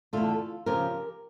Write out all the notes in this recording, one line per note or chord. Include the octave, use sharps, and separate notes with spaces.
E2 D3 A3 D4 F4 A4
C#3 F3 C#4 G4 A#4